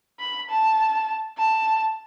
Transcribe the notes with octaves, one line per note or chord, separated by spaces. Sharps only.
B5
A5
A5